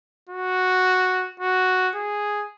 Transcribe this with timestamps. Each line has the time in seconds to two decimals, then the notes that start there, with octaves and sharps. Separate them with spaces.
0.29 F#4
1.40 F#4
1.95 G#4